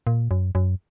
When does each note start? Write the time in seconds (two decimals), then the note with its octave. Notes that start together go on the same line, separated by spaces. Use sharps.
0.07 A#2
0.31 F#2
0.55 F#2